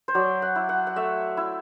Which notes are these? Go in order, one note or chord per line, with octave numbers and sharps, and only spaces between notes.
C5
F#3 D5
F#5
E4
F#5
F#5
A3 E5
E4